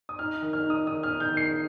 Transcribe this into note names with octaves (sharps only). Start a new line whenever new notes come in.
D#6
D#4 F6
D#3
F6
D#4
D#6
D#3 D#6
F6
D#4
G6
D#3
C7